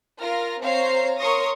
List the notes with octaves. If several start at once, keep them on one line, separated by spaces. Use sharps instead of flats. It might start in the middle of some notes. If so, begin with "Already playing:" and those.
F4 A#4 F6 A#6
C4 C5 C#5 F5 A#5 C7
A#4 C#5 C6 C#6 D#6 A#6